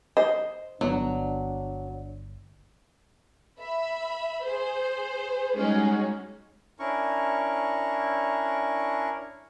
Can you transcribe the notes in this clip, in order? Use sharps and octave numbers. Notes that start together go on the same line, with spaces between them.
C5 D#5
G1 F#3 B3 D4
E5 B5
G#4 C5
G3 G#3 C#4 D#4 F#4 G#4
C#4 D4 E4 A#4 C#6